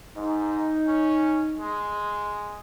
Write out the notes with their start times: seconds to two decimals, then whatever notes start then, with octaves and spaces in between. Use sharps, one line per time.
0.16 G#2 D#4
0.88 C#4
1.59 G#3